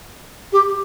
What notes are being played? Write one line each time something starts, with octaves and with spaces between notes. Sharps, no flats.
G4